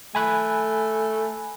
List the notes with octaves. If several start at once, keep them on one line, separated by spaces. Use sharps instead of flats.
A3 G#5 B5 F#6